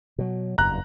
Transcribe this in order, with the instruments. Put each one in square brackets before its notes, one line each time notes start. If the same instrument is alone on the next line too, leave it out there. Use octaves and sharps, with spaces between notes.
[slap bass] B2 F#3
[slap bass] F#1 E2 G2 [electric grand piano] A#5 F#6